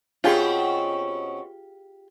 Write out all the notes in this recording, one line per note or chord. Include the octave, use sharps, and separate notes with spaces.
B2 C4 C#4 F4 G4 G#4